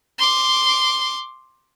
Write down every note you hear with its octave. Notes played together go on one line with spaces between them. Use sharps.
C6 D6